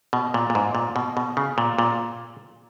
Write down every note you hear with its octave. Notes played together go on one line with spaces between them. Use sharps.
B2
A#2
A#2
G#2
A#2
B2
B2
C#3
A#2
A#2